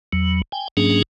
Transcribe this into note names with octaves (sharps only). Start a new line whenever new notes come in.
E2 F#3
G5 G#5
G#2 F#3 A#3 C#4 D4 G#4